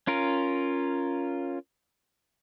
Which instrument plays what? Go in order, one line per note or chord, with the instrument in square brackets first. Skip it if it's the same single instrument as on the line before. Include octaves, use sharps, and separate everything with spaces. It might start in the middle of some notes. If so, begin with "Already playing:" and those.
[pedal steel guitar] C#4 F4 A#4